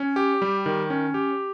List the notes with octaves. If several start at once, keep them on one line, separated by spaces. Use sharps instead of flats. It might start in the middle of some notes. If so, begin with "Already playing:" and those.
Already playing: C#4
G4
G3
D#3
C#4
G4